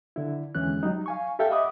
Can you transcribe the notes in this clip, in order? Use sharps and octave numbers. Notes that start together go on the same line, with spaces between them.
D3 E4
E2 D3 E3 G#3 C#4 F#6
F#3 G3 D#4
F5 G#5 C#6
G4 A4 E5 F5 G5
D#5 E5 F#5 B5 D6 D#6